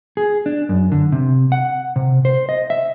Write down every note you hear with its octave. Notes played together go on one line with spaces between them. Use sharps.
G#4
D4
F#2
D3
C3
F#5
C3
C5
D#5
E5